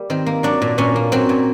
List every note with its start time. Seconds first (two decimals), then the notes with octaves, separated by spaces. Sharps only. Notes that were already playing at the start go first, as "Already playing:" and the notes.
Already playing: G3 A#3
0.10 D#3 C4
0.26 A#3
0.43 F#3 D4
0.62 A#2
0.78 A#2 C#4
0.96 A#3
1.12 F#3 C4
1.29 A#2